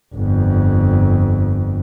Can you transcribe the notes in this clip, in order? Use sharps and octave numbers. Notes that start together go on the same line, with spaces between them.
G1 F2